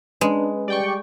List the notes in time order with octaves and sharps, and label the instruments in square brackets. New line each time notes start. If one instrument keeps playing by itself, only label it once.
[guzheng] G#3 [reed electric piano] C#4 B4 [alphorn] D4
[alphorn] G3 [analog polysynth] D5 G5 C#6